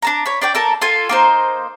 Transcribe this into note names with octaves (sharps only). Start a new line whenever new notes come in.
D4 A5 A#5
C#5 B5
D4 D5 G5
A4 A#4 A5
F4 A4 G#5
A#3 D#4 C5